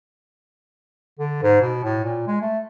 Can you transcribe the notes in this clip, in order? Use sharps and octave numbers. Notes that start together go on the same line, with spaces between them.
D3
G#2
B2
A2
A#2
G#3
A3